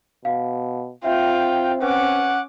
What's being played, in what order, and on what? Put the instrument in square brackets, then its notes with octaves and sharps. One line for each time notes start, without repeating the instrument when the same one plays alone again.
[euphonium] B2 [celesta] F5
[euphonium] C4 [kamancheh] F4 [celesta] E5 [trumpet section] G5
[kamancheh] C#4 D6 [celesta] B4 [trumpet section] F#5